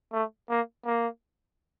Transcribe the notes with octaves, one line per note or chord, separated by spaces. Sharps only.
A3
A#3
A#3